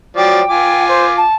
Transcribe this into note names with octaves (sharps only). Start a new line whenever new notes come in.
F3 F#3 D5 G5
F4 G#5 D6
C5
A5